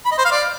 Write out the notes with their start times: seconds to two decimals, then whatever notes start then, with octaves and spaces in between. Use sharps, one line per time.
0.05 B5
0.12 D#5
0.18 C5
0.25 F5
0.31 D5